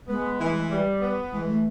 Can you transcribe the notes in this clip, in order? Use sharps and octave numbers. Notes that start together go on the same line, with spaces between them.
G#3 B3
E3
G3
B3
E3 G#3
A3